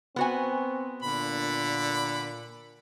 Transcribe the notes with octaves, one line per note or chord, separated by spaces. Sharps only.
B3 C4 F#4 G#5
A#2 D3 B5